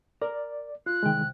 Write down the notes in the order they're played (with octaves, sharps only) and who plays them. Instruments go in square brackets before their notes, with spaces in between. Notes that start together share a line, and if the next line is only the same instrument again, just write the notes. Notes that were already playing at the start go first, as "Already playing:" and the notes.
[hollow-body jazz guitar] A#4 [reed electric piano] D5
[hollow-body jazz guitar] F4 [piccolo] F#6
[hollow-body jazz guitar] C2 G5 [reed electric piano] D#3 G#3